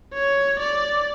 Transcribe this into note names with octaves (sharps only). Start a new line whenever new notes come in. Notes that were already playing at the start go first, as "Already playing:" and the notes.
C#5
D5